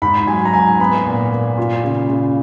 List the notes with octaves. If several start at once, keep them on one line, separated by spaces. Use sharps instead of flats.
G#2 B5
F#3 G#5
A#5
G#2 G#5
B3 B5
A#2
A#2
F4
C#3
C#3